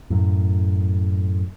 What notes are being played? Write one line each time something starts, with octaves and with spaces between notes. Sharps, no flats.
F#2 A2